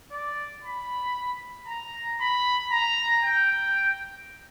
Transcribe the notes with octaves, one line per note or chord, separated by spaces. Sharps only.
D5
B5
A#5
B5
A#5
G5